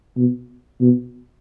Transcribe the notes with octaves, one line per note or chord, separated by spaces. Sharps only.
B2
B2